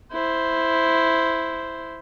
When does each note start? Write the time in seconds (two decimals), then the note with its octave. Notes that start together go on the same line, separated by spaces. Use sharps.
0.13 E4 C5